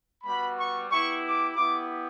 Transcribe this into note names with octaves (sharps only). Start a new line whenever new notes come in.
G3 B3 F#4 B5
C#6
B3 E4 G4 C#6
D6
B3 E4 G4 D6